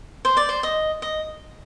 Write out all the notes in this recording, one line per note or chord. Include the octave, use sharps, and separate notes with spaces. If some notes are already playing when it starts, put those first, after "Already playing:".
C5
D5
C5
D#5
D#5